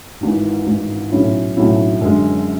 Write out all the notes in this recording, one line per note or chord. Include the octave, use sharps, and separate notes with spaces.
G#1 G#2 E3
G#1 G#2 E3
B1 A2 F#3 C#4 E4
B1 A2 F#3 C#4 E4
F#2 D3 G#3